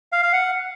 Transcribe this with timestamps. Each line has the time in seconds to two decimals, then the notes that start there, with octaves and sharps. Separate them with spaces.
0.12 F5
0.23 F5
0.33 F#5